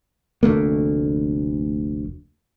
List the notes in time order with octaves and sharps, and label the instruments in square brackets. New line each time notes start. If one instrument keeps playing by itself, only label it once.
[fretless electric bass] F1 D2 A3 A#3